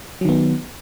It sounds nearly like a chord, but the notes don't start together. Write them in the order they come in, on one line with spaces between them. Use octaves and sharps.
F#3 D#3 B3